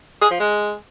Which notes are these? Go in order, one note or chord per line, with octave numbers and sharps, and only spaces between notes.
G#4
F3
G#3